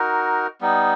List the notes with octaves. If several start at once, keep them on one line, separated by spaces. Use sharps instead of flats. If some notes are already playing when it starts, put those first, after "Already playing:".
Already playing: D#4 F#4 A#4
G3 B3 D#4